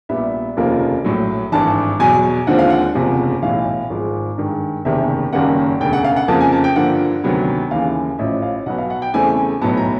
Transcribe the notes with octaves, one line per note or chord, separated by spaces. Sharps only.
A#1 A#2 G3 B3 E5
F1 D#2 C#3 F3 A#3
A#1 A2 F#3
G#1 G2 E3 A5
E2 B2 F#3 G#5
D#2 D3 F3 G#3 C4 F#5
F5
F#5
F#1 E2 C3 F3
B1 A2 E3 F5
G#1 G#2 F3 G#3
G2 D#3 G#3
F#1 E2 C3 D#3 E5
F#1 F#2 D#3 G3 A#3 F#5
E1 D2 C#3 G5
F#5
F5
F#5
F2 C#3 F3 A#3 A5
G#5
A5
G5
G2 D3 F3 A#3 F#5
D2 C3 D#3 F#3 B3
D#2 C#3 E3 F5
A1 A2 F3 E5
F5
B1 B2 F#3 B3 F#5
F5
F#5
G5
E2 C#3 E3 A3 C4 G#5
B1 A2 F#3 B3 A5
A#5